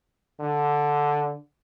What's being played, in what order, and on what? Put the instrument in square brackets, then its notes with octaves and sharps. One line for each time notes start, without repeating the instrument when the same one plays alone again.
[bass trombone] D3